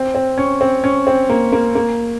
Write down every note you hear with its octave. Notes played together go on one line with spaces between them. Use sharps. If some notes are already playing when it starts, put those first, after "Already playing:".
Already playing: C4
C4
C#4
C4
C#4
C4
A#3
A#3
A#3